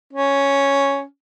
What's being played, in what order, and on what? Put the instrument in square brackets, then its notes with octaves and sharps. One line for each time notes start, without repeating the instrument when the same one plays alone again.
[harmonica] C#4